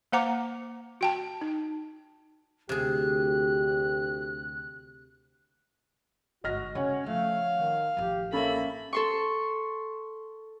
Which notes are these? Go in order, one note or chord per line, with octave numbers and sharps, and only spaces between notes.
A#3 C5 F#5 A#5 D6
F#4 G5 A5
D#4
D2 C3 G4 G#4 F#6
G1 G#2 F#4 D#5 F6 A#6
C#3 A3 C#4 C#5 F#5
F3 A3 F5
D#3
A1 F3 G4
A#3 C#4 A4 E5 B5
A4 C6 C#6